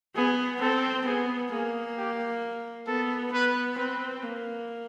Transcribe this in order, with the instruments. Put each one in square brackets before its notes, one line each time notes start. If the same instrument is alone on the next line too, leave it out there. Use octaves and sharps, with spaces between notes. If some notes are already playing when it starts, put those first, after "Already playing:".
[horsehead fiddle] B3 [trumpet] G#4
[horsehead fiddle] C4 [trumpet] A4
[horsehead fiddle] B3 [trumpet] G#4
[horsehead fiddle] A#3 [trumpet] G#4
[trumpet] G4
[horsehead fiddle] B3 [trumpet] A4
[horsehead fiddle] B3 [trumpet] B4
[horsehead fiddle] C4 [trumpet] B4
[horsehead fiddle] A#3